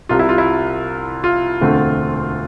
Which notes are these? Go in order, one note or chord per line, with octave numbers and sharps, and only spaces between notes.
C2 C3 G3 F4
E4
F4
E4
F4
E1 D2 D3 A3 C4